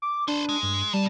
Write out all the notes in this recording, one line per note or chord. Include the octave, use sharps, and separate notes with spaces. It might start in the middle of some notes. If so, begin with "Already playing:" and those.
D6
D4 B4 C5
G#3
G2
B2 G3 A5